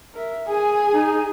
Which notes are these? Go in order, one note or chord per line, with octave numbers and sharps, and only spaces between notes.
A#4 E5
G#4 G#5
D#4